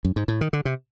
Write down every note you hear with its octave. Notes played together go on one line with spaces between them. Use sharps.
F#2
G#2
A2
D#3
D3
C3